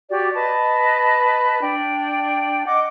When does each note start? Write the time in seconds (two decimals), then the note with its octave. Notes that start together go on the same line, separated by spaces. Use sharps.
0.09 F#4 G4 D5
0.34 B4 D#5 A5
1.60 D4 G5
2.66 D#5 F#5 D6